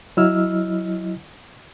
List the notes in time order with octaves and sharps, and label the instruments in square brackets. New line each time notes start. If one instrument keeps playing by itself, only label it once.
[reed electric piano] F#3 E4 D#5 E6 F6